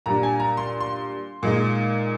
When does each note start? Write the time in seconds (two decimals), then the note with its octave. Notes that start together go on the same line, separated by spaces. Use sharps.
0.06 A#2 G3 D4 A#5
0.23 G#5
0.40 A#5
0.57 C6
0.80 C6
1.43 A#2 G#3 D#4